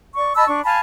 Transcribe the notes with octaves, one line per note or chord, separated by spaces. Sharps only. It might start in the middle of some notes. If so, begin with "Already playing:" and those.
D5 C#6
D#5 A5 B5 E6
D4 C#6
F5 G#5 A5 B5